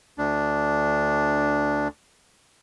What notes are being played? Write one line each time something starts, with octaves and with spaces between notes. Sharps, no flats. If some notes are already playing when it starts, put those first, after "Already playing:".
D2 D4